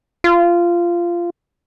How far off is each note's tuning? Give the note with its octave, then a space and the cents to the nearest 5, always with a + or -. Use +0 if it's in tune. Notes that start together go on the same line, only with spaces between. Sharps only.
F4 -15